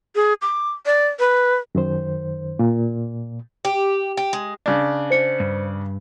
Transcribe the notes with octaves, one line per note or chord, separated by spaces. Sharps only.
G#4
D6
D5
B4
F#2 D#3 C5
A#2
G4
G4
G#3
C#3 D4
C5 C#7
G2